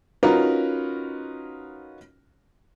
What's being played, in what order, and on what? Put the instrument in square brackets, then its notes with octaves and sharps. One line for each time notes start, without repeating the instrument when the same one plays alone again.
[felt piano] C#4 D#4 F4 F#4 A#4 B4